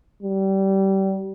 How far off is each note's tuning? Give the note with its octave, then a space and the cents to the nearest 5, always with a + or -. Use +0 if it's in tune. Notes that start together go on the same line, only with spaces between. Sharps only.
G3 -25